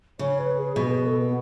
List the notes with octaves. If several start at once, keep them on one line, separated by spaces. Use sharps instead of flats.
C#3 C#5
B4
G#4
B2 G#4
B4
A4
B3